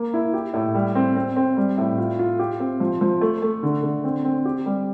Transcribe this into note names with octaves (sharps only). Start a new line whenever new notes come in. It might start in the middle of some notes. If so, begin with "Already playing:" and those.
Already playing: A#3
E4
G4
A2
G3
C4
C4
C4
G3
A2
F4
F4
G4
C4
F3
F3
A3
A3
D3
D3
C4
C4
G4
G3